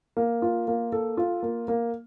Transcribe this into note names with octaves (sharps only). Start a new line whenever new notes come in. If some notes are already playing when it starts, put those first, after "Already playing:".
A#3
F4
A#3
A4
F4
A#3
A#3